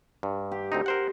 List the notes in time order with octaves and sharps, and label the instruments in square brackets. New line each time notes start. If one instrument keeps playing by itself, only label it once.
[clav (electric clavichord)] G2
[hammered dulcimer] G4
[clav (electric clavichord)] D2 C4 D#4
A#4 C5 F#5